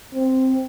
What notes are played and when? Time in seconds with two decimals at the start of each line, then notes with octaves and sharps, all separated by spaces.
0.14 C4